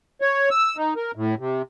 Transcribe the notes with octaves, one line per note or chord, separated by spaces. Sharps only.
C#5
E6
D#4
A#4
A2
C3